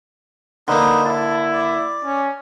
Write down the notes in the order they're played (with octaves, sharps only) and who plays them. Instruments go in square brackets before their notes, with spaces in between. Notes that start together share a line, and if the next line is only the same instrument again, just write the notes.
[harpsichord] D3 A#3 [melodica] D#4 B4 C5
[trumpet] E4 [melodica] A5
[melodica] D5
[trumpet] C#4